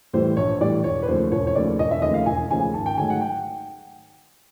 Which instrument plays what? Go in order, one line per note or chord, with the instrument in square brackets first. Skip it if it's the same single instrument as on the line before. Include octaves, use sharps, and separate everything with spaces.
[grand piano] A2 E3 G3 C5
A#1 C#5
A2 E3 G3 D5
E1 C#5
B4
D#2 C#3 F3 A3 C5
E1 C#5
C#5
D#2 C#3 F3 A3 D5
E1 D#5
E5
D#2 C#3 F3 A3 D#5
F5
E1 G#5
D#2 C#3 F3 A3 G#5
G#1 A5
G5
G#2 D#3 F#3 A3 G#5
F#5
G5